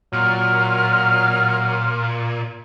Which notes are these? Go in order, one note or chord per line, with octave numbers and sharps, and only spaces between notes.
A#2 F#3 F6